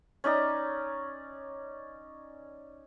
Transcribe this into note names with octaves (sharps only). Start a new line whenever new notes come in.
C#4 D#4 D5 A#5